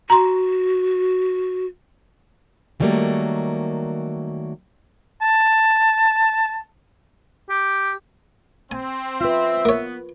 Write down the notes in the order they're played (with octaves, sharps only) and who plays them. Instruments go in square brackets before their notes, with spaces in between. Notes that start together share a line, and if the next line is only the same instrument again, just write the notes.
[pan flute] F#4 [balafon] A#5 C6
[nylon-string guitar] D#3 E3 F#3 G3 A3 A#3
[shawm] A5
G4
[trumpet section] C4 [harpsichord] G#5
[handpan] F4 B4 [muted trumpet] E5
[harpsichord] A#3 C#5 [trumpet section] B3